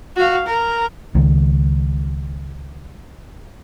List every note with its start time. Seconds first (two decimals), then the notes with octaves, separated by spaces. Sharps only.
0.16 F#4 F5
0.47 A#4
1.15 C#2 D#3